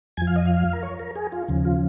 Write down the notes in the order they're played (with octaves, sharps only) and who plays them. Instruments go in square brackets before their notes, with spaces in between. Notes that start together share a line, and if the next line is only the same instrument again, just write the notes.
[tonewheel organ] F2 F3 G#5
F5
D#5
F5
A#4
C#5
A#4
G#4
F4
D#2 C#3 F3
F4